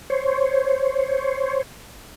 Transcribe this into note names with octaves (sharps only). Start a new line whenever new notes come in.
C5 C#5